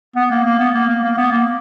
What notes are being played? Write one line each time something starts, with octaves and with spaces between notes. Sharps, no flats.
B3
A#3
A#3
B3
A#3
A#3
A#3
B3
A#3